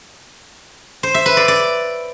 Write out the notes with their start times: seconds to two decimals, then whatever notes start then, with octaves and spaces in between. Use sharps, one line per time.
1.03 C5
1.14 E5
1.26 B4
1.37 D5
1.48 D5